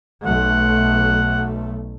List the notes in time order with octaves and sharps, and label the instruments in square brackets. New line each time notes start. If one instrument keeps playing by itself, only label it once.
[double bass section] B1 A3 [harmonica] F#5